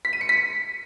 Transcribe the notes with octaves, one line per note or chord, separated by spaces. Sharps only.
B6
D#7
C#7
B6